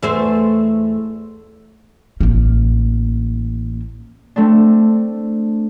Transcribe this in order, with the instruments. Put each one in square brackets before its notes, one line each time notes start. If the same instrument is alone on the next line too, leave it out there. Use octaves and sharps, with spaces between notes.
[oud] E2 A3 C5
[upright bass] A1 A#3
[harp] A3 C4 D4